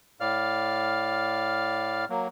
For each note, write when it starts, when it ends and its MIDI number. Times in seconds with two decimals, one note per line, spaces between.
0.20 2.05 45
0.20 2.05 74
0.20 2.05 77
0.20 2.05 89
2.09 2.28 54
2.09 2.28 58